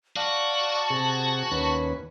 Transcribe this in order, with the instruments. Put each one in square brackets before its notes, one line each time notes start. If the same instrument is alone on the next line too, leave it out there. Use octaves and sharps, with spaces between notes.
[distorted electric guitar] F#4 [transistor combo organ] D5 F5 [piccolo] A5
[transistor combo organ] C3 G#4
D#2 C#4 B4